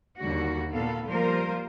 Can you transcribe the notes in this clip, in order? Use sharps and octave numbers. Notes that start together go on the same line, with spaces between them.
D#2 D3 G3 F#4
A#2 B3 A4 F5
F3 G3 A#3 F4 A#4 C5